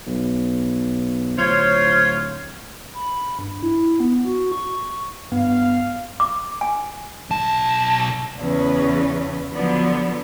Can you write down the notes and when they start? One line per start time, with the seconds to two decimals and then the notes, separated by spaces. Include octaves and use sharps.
0.06 B1
1.38 D1 F4 C5 C#5
2.94 B5
3.39 G2
3.63 E4
4.00 B3
4.25 F#4
4.52 C#6
5.32 G2 B3 F5
6.20 D6
6.61 G#5
7.30 B1 A5
8.37 E2 C#3 C#4 B4
9.51 D3 F3 F#3 B3